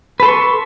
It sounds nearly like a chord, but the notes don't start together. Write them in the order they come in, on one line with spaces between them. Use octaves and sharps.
B4 A4 C6 C#6